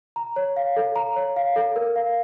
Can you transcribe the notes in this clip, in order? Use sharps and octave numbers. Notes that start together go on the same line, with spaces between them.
A#5
C#5
F5
A4
A#5
C#5
F5
A4
A#4
F5